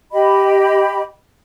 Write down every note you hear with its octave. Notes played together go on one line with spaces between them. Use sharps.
G4 D#5 B5